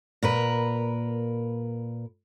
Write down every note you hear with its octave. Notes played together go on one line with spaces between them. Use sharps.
A#2 A#4 B4